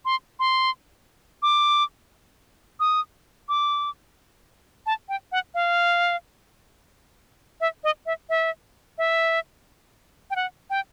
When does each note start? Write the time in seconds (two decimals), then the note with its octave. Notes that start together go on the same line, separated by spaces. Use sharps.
0.05 C6
0.39 C6
1.42 D6
2.80 D#6
3.49 D6
4.86 A5
5.09 G5
5.32 F#5
5.54 F5
7.61 E5
7.84 D#5
8.06 E5
8.29 E5
8.98 E5
10.31 G5
10.36 F#5
10.70 G5